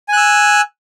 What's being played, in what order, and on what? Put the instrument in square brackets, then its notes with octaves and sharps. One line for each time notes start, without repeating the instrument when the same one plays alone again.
[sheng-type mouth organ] G#5
F#6
E6